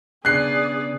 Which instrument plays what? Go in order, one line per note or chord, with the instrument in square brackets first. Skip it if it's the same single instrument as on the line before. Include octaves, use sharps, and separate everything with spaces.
[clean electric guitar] C#3 B3 D4 [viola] G#4 D5 [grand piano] F#6 C7